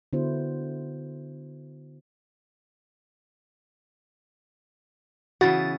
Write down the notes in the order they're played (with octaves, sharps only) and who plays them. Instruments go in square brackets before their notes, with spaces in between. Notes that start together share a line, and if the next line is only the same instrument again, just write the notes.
[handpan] D3 B3 E4 F#4 C5
[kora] C#3 E3 B3 [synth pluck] F#4 [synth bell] F#5 A6